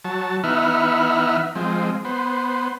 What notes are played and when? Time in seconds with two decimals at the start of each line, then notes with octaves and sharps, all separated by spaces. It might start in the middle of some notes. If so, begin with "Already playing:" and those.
0.04 F#3 A5
0.44 E3 B3 D#4 E5 F#5 F6
1.55 F3 G#3 C4
2.05 B3 C5